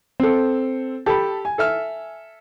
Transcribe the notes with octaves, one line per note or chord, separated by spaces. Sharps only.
C4 A4
G4 A4 A5 B5
G#5
A4 E5 F6